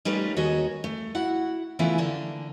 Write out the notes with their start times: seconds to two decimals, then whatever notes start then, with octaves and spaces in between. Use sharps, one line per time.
0.05 G3 A3 C#4 D#4 F4 B4
0.36 D#2 D#3 F#4 G#4 C#5 D#5
0.84 A3
1.15 E4 F#4 F#5
1.79 C#3 E3 A3 B3 E4 F4
1.98 D3 A#3 D4